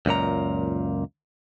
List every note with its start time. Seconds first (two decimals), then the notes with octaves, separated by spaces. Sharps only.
0.06 C#2 F#2 A#2 A#5